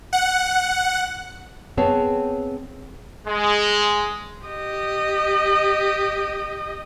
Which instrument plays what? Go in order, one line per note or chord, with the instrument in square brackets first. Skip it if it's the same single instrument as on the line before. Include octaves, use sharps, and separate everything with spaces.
[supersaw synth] F#5
[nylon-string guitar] B3 C4 G#4 C#5 A5
[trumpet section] G#3
[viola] G4 D#5